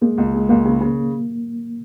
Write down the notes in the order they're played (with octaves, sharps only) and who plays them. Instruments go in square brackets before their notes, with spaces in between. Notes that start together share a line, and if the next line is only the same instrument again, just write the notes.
[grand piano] G#3 [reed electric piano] A#3
[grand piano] C#2
G#3
[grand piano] C#2 [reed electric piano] A#3
[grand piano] C#3
C#3